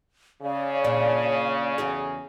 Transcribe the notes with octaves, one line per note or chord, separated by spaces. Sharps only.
C#3 C#5 D5 F5
A#2 D4
E2 F#4 G#4